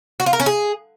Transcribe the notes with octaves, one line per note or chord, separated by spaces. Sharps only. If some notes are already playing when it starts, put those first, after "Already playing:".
F#4
F4
A#4
C#4
G#4